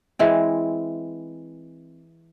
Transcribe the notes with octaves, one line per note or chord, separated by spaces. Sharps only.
E3 G#3 C4